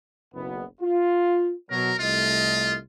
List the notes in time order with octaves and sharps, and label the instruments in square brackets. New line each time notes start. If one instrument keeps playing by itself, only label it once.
[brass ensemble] F#1 B1 B3
F4
[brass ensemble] B2 F#3 [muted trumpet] A#4
[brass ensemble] C2 A3 D#5 [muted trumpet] F4